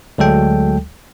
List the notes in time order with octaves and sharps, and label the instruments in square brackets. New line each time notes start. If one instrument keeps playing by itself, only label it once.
[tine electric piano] D2 F#3 G#3 A4 G5